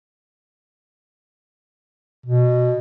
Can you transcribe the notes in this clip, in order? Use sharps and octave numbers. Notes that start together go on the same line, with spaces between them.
B2